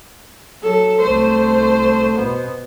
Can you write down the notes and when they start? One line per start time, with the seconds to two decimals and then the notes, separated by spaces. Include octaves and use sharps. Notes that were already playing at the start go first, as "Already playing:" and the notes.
0.63 F#3 A4
1.01 C2 A3 C5
2.16 B2 B3